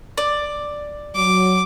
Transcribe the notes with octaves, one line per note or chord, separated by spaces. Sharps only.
D5
F#3 D6